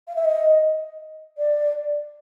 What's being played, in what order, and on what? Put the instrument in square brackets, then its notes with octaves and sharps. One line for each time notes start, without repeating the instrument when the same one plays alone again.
[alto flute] F5
E5
D#5
D5